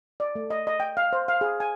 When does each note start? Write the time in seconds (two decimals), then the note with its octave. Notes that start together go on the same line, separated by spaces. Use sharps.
0.20 D5
0.35 A3
0.50 D#5
0.67 D#5
0.80 G5
0.97 F5
1.13 C5
1.28 F5
1.41 G#4
1.60 G#5